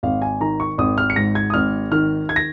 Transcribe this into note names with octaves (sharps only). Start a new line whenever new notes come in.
G#1 F5
G#5
D#3 A#5
C#6
G#1 D#6
F6
C#7
G#2 A#6
G#6
D#6
G#1 F6
D#3 F6
G#6
A#6